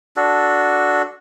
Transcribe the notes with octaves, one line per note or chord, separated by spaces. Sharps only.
D4 F#4 A4